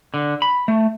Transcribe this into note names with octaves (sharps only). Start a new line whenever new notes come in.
D3
B5
A3